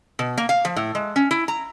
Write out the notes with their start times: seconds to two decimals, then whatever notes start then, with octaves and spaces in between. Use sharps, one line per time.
0.19 B2
0.38 A#3
0.49 F5
0.65 F3
0.76 A2
0.95 G#3
1.16 C#4
1.31 E4
1.48 A#5